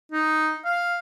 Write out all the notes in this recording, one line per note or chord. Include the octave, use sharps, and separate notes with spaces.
D#4
F5